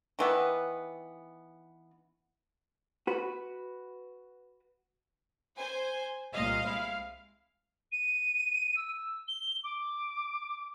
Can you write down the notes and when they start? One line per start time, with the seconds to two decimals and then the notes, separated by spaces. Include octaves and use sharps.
0.19 D#3 E3 B3
3.07 F#4 B4
5.57 C5 G#5
6.33 C2 A#2 D#5 F5
6.63 G#3 E4
7.91 D#7
8.76 E6
9.27 G7
9.63 D6